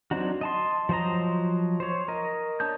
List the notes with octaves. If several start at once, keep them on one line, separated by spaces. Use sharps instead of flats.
F#3 C4 D4 D#4 F#4
D#5 A5 C6
F3 F#3 C5 D#5 A#5
C5 C#5
A#4 D#5
D4 C#5 A5 D#6 G6